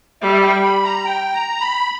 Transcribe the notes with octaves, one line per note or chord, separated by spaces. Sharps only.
G3 E5
G5
B5
A#5
G5
A#5
B5